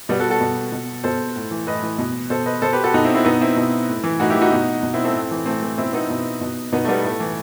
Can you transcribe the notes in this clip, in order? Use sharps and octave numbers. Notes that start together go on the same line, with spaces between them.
B2 G3 B3
F#4 A4
F#4 A4
B2
B2
B2 A4 C5
A2
E3
A2 B4 D#5
E3
B2
B2 A4 C5
B4 D#5
B2 A4 C5
G4 B4
F#4 A4
B2 D#4 F#4
C4 E4
C4 E4
B2 B3 D#4
C4 E4
B2
A2
E3
A2 D#4 F#4
E4 G4
E3
D#4 F#4
B2
B2
C4 E4
A3 C4
A2
E3
A2 A3 C4
E3
B2 C4 E4
B3 D#4
B2
B2
B2 B3 D#4
A3
G3 B3
A2 A3
E3